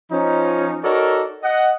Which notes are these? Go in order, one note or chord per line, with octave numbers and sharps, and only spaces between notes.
F3 C#4 D#4
D#4 F#4 A4 A#4 C#5 D5
D#5 F#5